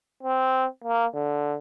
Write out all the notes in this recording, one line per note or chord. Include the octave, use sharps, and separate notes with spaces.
C4
A#3
D3